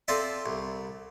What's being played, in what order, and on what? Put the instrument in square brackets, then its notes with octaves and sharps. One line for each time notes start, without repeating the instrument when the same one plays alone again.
[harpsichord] C4 F4 A4 C5 D5 E5
C2